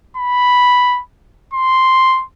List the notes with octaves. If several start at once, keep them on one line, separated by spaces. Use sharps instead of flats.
B5
C6